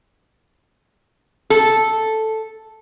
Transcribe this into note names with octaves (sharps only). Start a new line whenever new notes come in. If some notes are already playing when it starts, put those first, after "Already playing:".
A4